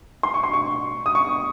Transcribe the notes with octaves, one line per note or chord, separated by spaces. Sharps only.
C6
C#6
C6
C#6
D#6
C#6